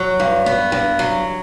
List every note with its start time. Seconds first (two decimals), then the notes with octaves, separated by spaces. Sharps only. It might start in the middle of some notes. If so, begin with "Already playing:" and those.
Already playing: F#3
0.20 G2
0.46 B3
0.72 G2
0.99 F#3